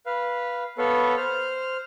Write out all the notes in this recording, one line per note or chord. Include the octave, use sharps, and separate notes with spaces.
B4 F5
B3 A4 B4 C#5 F5
C5 F6